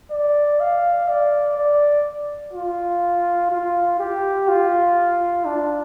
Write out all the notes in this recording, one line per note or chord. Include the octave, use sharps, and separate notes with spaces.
D5
F5
D5
D5
F4
F4
G4
F4
D4